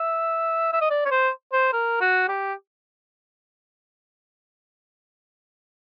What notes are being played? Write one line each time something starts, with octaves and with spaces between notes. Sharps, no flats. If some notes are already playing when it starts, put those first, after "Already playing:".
Already playing: E5
E5
D#5
D5
C#5
C5
C5
A#4
F#4
G4